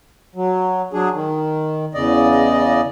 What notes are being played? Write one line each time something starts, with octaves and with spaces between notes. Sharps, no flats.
F#3
F#3 D4 G#4
D#3
E2 C#3 D5 D#5